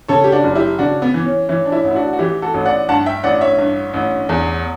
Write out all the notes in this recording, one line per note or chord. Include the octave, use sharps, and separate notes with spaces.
C#3 A4 C#5
G4
D4 F#4
F#1
E4 G4
C#3 D4 F#4
B3
E3
C#4
E3 C#4 E4
D4
C#4 E4
A1
E4
D4 F#4
F#4
E3 E4 G4
F#4 A4
A1
D5 F#5
G2 F#5 A5
E5 G5
A1 D5 F#5
C#5 E5
G2
A1
E2